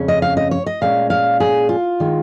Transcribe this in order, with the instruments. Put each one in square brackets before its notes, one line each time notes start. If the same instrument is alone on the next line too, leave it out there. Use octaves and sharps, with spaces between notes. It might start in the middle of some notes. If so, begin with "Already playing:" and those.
Already playing: [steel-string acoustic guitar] F2 C#3 G#3 C#4
D#5
F5
D#5
C#5
D#5
A#2 G#3 C#4 F5
F5
G#4
F4
D#3 G#3